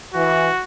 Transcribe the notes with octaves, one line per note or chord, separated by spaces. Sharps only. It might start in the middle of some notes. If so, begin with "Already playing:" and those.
E3 F#4